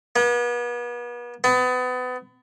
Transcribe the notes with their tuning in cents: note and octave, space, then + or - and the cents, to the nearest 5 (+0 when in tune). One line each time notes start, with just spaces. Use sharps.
B3 -40
B3 +30